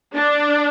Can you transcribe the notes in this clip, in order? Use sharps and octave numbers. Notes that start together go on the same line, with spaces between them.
D4